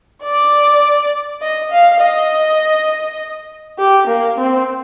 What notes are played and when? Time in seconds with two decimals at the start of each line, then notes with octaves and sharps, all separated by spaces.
0.24 D5
1.42 D#5
1.71 F5
2.01 D#5
3.78 G4
4.07 A#3
4.38 C4